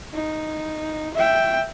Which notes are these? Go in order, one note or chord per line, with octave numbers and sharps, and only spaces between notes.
D#4
E5 G5